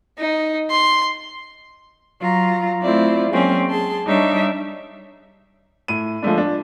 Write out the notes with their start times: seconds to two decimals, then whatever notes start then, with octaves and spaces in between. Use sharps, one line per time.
0.19 D#4
0.71 C6
2.20 F#3 F4 A#5
2.81 A3 C4 E4 F4 D5
3.30 F#3 G#3 A#3 C4 C#4
3.69 G#4 A5 C6
4.06 G3 D4 D#4 C#5 E5
5.88 A2 D#7
6.22 F3 G#3 A3 D4
6.38 D4